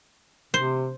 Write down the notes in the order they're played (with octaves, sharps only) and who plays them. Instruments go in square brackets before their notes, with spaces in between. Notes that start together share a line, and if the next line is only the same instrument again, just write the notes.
[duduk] C3 [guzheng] C5